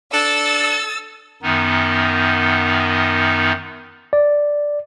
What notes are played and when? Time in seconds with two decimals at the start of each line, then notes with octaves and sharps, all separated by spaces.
0.13 D4 A4 E6 A6
1.42 F#2 D#3 B3 D#4
4.13 D5